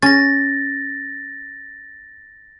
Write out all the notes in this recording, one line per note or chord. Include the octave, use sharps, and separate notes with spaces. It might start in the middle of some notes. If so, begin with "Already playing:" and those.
C#4 A6 A#6